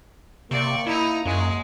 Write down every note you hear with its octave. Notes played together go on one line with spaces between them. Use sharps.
C3 A#3 D5 C#6
D#4 E4 A#5
F#2 G#3